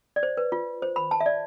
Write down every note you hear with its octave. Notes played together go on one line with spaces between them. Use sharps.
D5
C5
B4
F4
C5
B5
A5
E5
D5